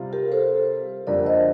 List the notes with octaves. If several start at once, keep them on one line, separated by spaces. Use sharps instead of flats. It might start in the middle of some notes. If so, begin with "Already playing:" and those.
Already playing: C3 G3 C4 F4
G4 A#4
A4 C5
F2 D3 G3 A#3 A#4 D5
C5 D#5